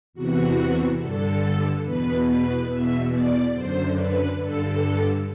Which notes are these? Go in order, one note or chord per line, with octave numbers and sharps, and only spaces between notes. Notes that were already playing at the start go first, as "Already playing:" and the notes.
E2 C3 E3 F#4
G2 D3 A4
E2 B2 B4
B4
E2 B2 E5
D5
F#2 D3 C5
B4
G2 D3 A4